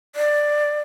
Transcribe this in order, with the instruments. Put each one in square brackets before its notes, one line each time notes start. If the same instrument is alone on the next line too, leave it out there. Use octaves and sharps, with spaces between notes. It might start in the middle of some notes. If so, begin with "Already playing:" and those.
[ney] D5